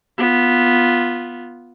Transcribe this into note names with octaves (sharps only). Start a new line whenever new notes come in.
B3 F4